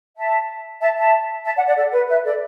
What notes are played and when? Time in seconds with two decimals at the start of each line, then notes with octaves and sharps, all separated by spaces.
0.17 E5 A5
0.81 E5 A5
0.97 E5 A5
1.45 E5 A5
1.56 D5 F#5
1.66 D5 F#5
1.77 A4 D5
1.93 B4
2.08 B4 E5
2.25 A4 D5